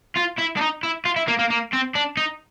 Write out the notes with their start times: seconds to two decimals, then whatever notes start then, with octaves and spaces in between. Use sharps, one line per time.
0.16 F4
0.38 E4
0.57 D4
0.61 D#4
0.83 E4
1.05 F4
1.16 E4
1.28 A#3
1.39 A#3
1.50 A#3
1.73 C4
1.95 D4
2.17 D#4